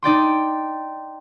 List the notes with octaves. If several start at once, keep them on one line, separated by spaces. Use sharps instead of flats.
D#4 D5 G5 C6